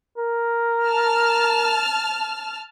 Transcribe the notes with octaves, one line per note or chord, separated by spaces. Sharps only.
A#4
A5 F6